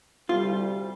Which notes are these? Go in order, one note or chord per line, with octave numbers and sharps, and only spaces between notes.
D2 C3 G3 F4